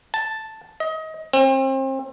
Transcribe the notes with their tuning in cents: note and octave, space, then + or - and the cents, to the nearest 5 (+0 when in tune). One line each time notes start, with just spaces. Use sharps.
A5 +0
D#5 +25
C4 +35